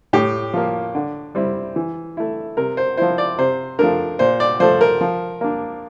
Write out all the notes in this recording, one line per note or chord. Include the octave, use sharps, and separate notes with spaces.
A2 G4
F3 A#3
D3
G3 C4 E4
E3
A3 E4
C3 A#4
C5
F3 C4 E4 C5
D5
C3 C5
F3 A3 D4 A#4
A#2 C5
D5
F3 A3 C5
A#4
F3
A#3 D4